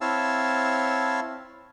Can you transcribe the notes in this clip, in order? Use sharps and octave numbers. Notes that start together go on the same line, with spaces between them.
C4 E4 C#5 F5 A5 E6